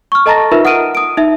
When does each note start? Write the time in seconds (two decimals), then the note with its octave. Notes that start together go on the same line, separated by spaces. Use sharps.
0.12 C#6 F6
0.26 A4 D#5 A5 A#5 A6 A#6
0.52 D#4 F4 A#4 B4 E5
0.65 F#5 D#6 F6 D7 D#7
0.95 D#6 D7
1.17 D#4 E5